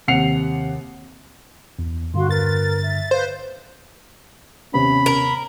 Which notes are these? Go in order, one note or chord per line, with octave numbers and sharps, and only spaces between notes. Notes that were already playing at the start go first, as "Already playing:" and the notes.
D#2 C3 F#5 C7 C#7 F7
E2
G2 D3 F#4 F5 C6
A#4 B4 A6
E5
B4 C5 F5
D#2 C3 B3 C#4 B5
A#4